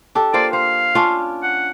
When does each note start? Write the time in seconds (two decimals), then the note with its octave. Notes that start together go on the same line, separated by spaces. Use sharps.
0.15 D4 G4 A4
0.34 A#3 F4 C5 D5
0.53 C5 F5
0.95 C#4 D4 F4
1.43 F#5